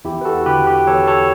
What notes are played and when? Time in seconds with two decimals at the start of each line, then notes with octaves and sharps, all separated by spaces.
0.05 E2 E4 G4
0.21 B4
0.25 F#4 A4
0.46 D3 G4 B4
0.66 G4 B4
0.87 E2 A4 C#5
1.07 A4 C#5